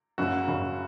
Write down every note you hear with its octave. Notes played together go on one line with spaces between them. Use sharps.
F#1 F#2 C#3 F#4
F#1 F#2 C#3